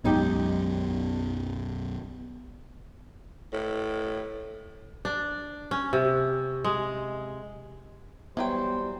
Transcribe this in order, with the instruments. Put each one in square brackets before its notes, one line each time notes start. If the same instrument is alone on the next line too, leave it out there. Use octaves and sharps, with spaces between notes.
[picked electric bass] B1 F#2 B2 [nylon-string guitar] G#3 D#4 G4 [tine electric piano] B3
[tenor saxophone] A2
[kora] D4
C#4
C3
G#3
[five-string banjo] E3 F#3 G5 [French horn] G3 [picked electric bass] B3 [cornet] C5